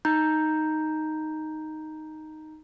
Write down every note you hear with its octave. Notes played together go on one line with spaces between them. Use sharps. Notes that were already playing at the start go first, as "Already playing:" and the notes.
D#4 A#5 G6